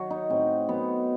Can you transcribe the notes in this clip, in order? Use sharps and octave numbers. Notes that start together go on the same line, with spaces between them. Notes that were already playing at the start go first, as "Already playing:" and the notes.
Already playing: D#3 F#3 F#4
D#4
A2 C4
F#3 B3